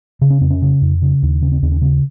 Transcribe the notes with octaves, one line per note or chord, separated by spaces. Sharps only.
C#3
C#4
F2 C4
C#4
C#3
F2
C#3
D#2
C#3 C#4
C4
D#2 C4
C#4
C#3 C4